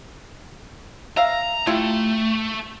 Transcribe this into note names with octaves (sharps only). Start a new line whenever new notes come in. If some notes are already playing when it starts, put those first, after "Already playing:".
E5 F5 A#5
A3 E4 F4 G4